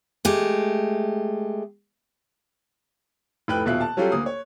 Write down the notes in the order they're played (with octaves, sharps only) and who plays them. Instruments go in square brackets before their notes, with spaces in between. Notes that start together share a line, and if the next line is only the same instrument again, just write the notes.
[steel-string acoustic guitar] G#3 A3 G4
[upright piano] F1 A2 B4 G5 B5 F#6
D#1 B2 F4 E5 F#6
A5
F#3 G3 C#4 F4 G4 A4
D2 A#3 D#6
C#5